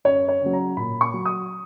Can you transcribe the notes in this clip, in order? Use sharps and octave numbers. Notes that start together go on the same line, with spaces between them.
F#2 C#5
C#5
C#3
F#3
A#5
A#2 B5
C#6
F#3
D#6